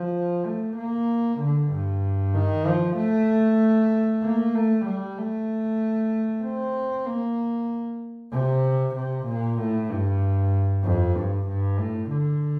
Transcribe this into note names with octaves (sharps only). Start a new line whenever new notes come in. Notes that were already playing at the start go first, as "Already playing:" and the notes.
Already playing: F3
A3
A#3
D3
G2
D#3
F3
A3
A#3
A3
G3
A3
C4
A#3
C3
C3
A#2
A2
G2
F2
G2
G2
A2
D3